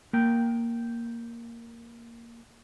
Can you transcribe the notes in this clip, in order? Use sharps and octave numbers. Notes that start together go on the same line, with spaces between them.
A#3 G5